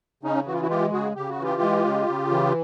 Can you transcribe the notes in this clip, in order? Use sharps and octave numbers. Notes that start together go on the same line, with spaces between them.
C#3 C#4 D#4
E3 F#4
F4
E4 F#4
G#3 F4 G4
C#3 F#4 G#4
C#3 G4
F#4
E3 F4 G4
G#3
C#3
C#3
E3